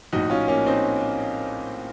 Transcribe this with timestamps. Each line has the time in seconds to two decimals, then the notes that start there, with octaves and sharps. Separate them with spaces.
0.13 A#1 A2 D#4 F#4
0.30 C#4 F4
0.48 A#3 C#4
0.66 C4 D#4